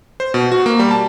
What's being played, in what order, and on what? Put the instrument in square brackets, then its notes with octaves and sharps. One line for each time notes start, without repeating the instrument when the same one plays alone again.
[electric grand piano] C5
B2
F#4
A#3
G3
A5